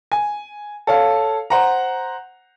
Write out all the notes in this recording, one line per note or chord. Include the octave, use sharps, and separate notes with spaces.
G#5
A4 C#5 F5
C5 F#5 A#5